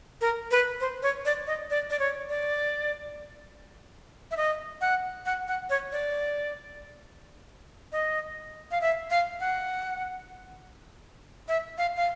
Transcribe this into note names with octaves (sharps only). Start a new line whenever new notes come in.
A#4
B4
C5
C#5
D5
D#5
D5
D5
C#5
D5
E5
D#5
F#5
F#5
F#5
C#5
D5
D#5
F5
E5
F5
F#5
E5
F5
F5